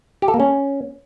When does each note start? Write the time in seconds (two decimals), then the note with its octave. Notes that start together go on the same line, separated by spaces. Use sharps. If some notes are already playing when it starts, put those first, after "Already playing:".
0.22 G4
0.28 A4
0.34 A#3
0.40 C#4